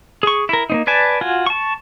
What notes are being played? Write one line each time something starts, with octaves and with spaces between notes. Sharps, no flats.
G#4 C#6
E4 A#4
A#3 C4 D#4
B4 D5 G#5 A5
F4 F#4 G#5
A5 C#6